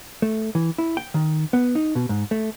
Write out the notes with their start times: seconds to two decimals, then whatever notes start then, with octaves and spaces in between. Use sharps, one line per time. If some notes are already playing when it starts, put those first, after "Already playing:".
0.22 A3
0.55 E3
0.78 E4
0.97 G5
1.14 D#3
1.53 B3
1.75 D#4
1.95 B2
2.09 G#2
2.31 A3